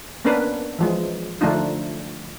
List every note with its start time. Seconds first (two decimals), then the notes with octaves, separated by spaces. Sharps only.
0.25 A#3 B3 C#4 D4 A#4 B4
0.79 E3 F3 G#3
1.41 D3 F3 A3 D4 D#4 F4